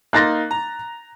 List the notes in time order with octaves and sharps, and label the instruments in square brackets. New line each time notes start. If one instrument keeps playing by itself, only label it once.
[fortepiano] A#3 D#4 C6 [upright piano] F#6 A6 A#6
[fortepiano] A#5